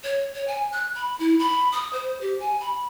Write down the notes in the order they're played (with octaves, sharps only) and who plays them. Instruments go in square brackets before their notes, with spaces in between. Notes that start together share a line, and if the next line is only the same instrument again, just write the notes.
[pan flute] C#5
C#5
G#5
F#6
B5
E4
B5
D#6
C5
G4
G#5
B5